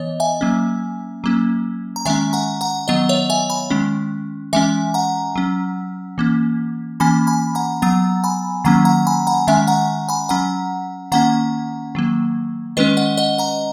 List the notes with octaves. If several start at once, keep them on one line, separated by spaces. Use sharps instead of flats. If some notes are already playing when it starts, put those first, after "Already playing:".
Already playing: E3 B3 C#5 D#5
E5 G#5
F#3 A#3 C#4
F#3 A#3 C#4
A#5
D#3 G#3 C#4 E5 G#5
F#5 A#5
F#5 A#5
D#3 F#3 B3 D#5 F#5
C#5 E5
E5 G#5
G#5 B5
D#3 G#3 C#4
E3 G#3 C#4 E5 G#5
F#5 A#5
F#3 C#4
E3 A#3 C#4
E3 A#3 C#4 G#5 B5
G#5 B5
F#5 A#5
F#3 B3 F#5 A#5
G#5 B5
D#3 F#3 A#3 C#4 F#5 A#5
F#5 A#5
G#5 B5
F#5 A#5
D#3 G#3 C#4 E5 G#5
F#5 A#5
G#5 B5
F#3 C#4 F#5 A#5
D#3 A#3 C#4 F#5 A#5
D#3 F#3 A#3
D#3 G#3 C#4 B4 D#5
D#5 F#5
D#5 F#5
F#5 A#5